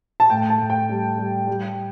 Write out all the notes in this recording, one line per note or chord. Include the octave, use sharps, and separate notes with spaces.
A5
A2 G5
A5
A2
G5
G3
G3
G3